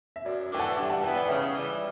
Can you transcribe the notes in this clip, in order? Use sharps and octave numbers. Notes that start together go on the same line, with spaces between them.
E5
F#2 D5
E3 A3 D4 G5
F#5 A5
G2 E5 G5
F#5 A5
E3 B3 E5 G5
D5 F#5
C#3 E5 G5
E3 G3